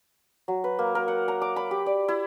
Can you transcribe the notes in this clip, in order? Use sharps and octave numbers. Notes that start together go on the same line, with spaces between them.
F#3
B4
A#3
A#4
F#5
A#5
D6
B5
G4
D5
E4